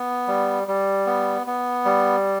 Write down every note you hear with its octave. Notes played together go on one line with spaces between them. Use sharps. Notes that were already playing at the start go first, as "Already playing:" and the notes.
Already playing: B3
G3
G3
B3
B3
G3